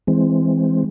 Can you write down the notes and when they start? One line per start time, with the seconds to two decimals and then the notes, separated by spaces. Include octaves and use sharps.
0.07 E3 G#3 C4